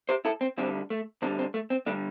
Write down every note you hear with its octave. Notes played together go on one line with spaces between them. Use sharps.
G4 C5
E4 A4
C4
D2 D3 G3 C4
A3
D2 D3 G3 C4
C4
A3
C4
D3 G3 A3 D4